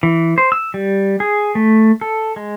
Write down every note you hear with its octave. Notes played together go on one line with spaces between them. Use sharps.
E3
C5
E6
G3
G#4
A3
A4
G#3